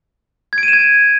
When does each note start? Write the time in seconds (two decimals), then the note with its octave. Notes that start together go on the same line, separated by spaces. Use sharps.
0.53 G#6
0.58 D7
0.63 D#7
0.68 E7
0.73 G#6